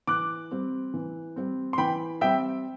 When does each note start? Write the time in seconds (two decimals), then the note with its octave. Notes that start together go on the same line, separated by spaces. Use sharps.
0.07 E3 D6 F#6
0.51 G3 C4
0.94 E3
1.36 G3 C4
1.73 C6
1.78 E3 G5 B5
2.21 G3 C4 E5 G5